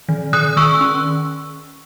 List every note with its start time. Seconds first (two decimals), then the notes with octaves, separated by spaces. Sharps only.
0.09 D#3
0.33 D#3 D#6 F#6
0.57 D#3 C#6 E6
0.81 C#4